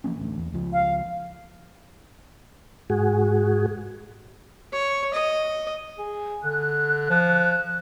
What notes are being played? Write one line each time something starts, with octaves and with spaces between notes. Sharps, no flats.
F3 A#3 C#4
A1 D2
E2
C#2 F3
F5
G#2 F#4 G#4
C#5
D#5
G#4
D3 F#6
F3